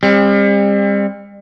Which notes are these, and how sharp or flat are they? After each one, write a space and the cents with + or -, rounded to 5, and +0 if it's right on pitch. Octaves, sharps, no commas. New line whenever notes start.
G3 +40 C4 +30